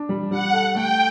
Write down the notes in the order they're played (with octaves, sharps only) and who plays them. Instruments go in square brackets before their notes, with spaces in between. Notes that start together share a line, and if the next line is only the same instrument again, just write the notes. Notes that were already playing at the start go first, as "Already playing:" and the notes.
Already playing: [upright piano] D4
G3
[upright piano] G3 [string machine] F#5
[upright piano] A4
[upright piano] A3 [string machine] G5